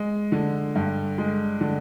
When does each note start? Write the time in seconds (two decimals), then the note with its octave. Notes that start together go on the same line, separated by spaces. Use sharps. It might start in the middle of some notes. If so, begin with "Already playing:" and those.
Already playing: G#3
0.32 D3
0.75 G2
1.18 G#3
1.61 D3